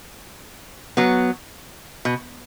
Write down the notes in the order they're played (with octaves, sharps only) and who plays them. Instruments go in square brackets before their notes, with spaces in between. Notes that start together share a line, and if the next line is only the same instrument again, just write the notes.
[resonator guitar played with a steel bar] F#3 B3
B2